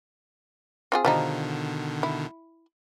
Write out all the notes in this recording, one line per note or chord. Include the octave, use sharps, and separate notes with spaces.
C4 F4 G#4
B2 D3 D#3 F3 G3 D#4
E4